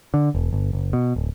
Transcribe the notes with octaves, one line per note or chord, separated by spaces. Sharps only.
D3
E1
G1
F#1
B2
D1